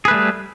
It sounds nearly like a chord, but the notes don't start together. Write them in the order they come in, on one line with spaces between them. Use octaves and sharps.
G#4 B4 A3 G3